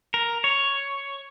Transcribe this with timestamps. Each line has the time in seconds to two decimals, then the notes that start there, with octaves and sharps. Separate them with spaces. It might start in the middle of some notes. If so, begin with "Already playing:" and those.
0.14 A#4
0.44 C#5